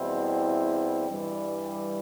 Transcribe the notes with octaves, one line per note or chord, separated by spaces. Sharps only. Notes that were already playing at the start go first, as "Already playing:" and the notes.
Already playing: E2 B2 G3 C4 E4
G2 E3 G3